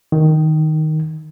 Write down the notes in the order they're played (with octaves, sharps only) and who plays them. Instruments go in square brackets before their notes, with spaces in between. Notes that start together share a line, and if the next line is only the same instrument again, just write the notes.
[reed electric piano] D#3